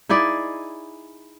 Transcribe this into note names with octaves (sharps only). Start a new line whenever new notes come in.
D#4 E4 G#4 D5